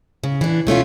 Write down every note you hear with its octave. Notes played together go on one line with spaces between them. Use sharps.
C#3
E3 D4
B2 A3 C#4 F4